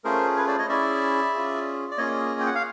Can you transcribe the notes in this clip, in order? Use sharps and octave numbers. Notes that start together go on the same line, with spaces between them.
A3 C#4 F4 G#4 A#4 C5
B4 C#5
C5 D5
C#5 D#5
C#4 E4 G#4 D5 E5
C#4 F4 G#4
D5
A#3 C#4 F4 G#4 C#5 D#5
G5
F#5
F5